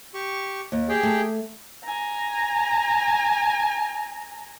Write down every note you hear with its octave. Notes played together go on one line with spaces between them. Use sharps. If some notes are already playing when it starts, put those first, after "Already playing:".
G4 C#6
D#2
G4 G#4 G5
A3
G#5 A#5